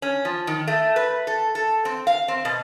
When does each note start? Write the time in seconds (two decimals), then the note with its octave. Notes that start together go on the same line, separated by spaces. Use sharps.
0.02 C#4
0.25 F3
0.47 D#3
0.67 A3
0.96 B4
1.27 A4
1.55 A4
1.85 C4
2.07 F5
2.28 C4
2.45 B2